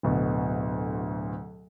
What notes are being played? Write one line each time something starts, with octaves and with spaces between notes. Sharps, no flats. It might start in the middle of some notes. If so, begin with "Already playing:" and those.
D1 D2 B2